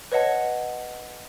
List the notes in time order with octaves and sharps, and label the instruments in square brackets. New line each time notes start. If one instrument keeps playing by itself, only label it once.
[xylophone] B4 C#5 D#5 F#5 A5